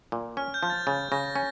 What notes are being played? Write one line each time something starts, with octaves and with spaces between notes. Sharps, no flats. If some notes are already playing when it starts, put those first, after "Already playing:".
A#2
C#4 F6
G6
F3
A6
C#3 A6
C#3 A#6
C#4